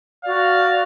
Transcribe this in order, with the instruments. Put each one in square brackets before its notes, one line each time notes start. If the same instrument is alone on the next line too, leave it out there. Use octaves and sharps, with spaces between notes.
[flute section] F#4 D5 [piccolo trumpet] F5